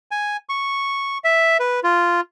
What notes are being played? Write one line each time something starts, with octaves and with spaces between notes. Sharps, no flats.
G#5
C#6
E5
B4
F4